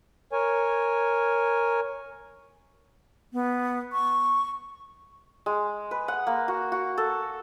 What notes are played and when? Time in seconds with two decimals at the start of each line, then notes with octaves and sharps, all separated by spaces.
0.32 A#4 C#5 G#5
3.33 B3
3.93 C#6
5.46 G#3
5.91 B4
6.08 F#5
6.27 A#3
6.48 F#4
6.72 F#4
6.98 A4